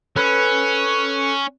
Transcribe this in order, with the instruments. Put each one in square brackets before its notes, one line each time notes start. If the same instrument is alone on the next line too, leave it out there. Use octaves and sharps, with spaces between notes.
[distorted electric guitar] C#4 [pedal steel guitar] A4 B4 B5